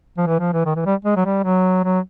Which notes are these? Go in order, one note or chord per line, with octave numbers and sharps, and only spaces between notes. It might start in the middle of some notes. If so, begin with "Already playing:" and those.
F3
E3
F3
E3
D#3
E3
G3
G#3
F#3
G3
F#3
F#3